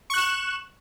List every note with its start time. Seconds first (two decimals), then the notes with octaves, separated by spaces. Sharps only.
0.10 C#6
0.14 F#6
0.18 E7